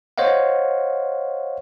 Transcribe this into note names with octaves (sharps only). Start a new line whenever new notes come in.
C5 C#5 D#5 F5 F#5